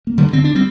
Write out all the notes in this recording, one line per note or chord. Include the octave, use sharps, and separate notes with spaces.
A#3
G2 D3 G3
D3 C4
D4
G3 C4